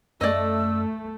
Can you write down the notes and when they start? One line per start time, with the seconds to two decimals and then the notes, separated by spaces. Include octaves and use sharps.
0.21 F#2 A3 D5 D#5 E6